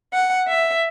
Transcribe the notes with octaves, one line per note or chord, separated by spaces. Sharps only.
F#5
E5